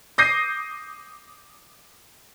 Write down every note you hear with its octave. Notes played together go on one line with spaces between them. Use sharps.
D6 D#6 G6 A#6 C7 D#7